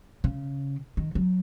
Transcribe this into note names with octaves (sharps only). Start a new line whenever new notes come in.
C#3
D#3
F#3